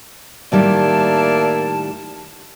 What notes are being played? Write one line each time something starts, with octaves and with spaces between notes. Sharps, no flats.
A2 D#3 G3 A#3 E4 D5 A5